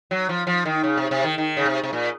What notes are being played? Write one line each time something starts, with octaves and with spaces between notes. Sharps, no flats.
F#3
F3
F3
D#3
C#3
C3
C3
D#3
D#3
C#3
C3
C3
A#2